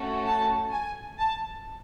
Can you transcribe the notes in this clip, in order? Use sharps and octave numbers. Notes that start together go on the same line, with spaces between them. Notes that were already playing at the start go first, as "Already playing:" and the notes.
Already playing: A3 C#4 F#4 A4
A5
G#5
A5